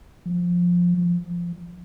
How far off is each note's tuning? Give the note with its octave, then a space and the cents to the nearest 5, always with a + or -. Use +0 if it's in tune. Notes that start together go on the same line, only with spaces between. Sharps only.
F3 +10
F3 -15